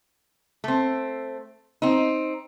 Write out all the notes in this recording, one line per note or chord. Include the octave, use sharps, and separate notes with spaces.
A3 C4
C4 D#4